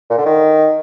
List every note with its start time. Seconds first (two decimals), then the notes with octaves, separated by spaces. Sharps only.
0.10 A#2
0.18 D3
0.25 D#3